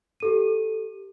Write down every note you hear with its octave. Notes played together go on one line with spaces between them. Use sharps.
G4 A4 D#7